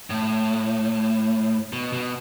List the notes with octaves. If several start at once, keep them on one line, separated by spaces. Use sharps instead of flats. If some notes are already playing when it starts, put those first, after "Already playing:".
A2
B2
B2